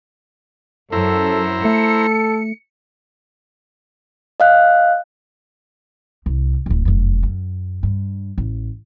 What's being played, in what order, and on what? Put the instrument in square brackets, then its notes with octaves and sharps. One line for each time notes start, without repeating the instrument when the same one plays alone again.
[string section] F#2 [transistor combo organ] E4 C5 A#5 [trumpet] A4
[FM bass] A3 [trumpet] A4 [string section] C#7
[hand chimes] D#5 F5 F#6
[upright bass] C2
D1 A#1
F1 F#2
F#2
G2
A1